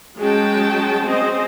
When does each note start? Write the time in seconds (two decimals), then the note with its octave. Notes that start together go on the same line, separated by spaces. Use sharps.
0.17 F#3 G#3 C#4 G5 A5
1.05 C4 C#4 G#4 C5 D#5